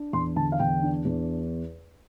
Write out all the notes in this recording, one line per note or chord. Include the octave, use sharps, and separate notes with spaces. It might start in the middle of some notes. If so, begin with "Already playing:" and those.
Already playing: D4
E2 C6
D3 A5
F5
E2 G5
D4
E2